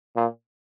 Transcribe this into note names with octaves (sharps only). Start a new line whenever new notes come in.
A#2